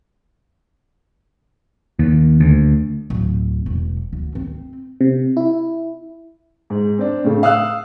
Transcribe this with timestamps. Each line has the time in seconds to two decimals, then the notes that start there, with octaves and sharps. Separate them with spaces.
1.99 D#2
2.40 D2
3.10 D1
3.66 E1
4.13 D2
4.35 C4
5.01 C3
5.37 E4
6.70 G#2
6.98 C4 D4
7.24 A2 C#3
7.43 F5 D#6 E6 F#6